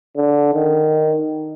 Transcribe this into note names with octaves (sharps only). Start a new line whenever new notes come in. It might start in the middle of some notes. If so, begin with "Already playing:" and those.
D3
D#3